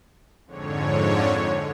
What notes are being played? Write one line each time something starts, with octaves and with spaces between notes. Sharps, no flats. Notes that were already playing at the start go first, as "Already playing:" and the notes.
F2 G#2 D3 C#5